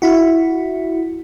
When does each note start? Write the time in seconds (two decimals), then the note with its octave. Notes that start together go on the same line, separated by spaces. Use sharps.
0.02 E4 F#4